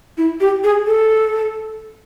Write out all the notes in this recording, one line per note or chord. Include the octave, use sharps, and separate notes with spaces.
E4
G4
G#4
A4